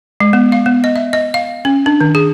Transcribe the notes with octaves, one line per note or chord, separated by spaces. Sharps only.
G#3
B3
F5
B3
D#5
E5
D#5
F5
C#4
D4
D#3
G#4